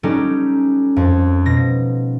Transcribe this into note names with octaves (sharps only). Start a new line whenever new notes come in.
G3 C#4 D#4 F#4 G4 A4
F2
B2 A#6